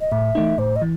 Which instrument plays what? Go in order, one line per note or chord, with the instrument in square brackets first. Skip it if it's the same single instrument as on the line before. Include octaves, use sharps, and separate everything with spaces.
[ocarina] D#5
[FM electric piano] A2 [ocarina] E5
[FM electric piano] E3 A3 D#4
[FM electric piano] A2 [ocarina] C5
[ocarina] D#5
[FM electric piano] E3